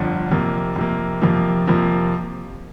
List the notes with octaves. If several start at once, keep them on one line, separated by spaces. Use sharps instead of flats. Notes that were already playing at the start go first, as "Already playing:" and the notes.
Already playing: G1 F2 D3
F2 C3 A#3
F2 C3 A#3
F2 C3 F3 A#3
F2 C3 F3 A#3